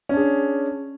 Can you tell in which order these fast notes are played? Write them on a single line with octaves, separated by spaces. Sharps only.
C#4 D4 G#4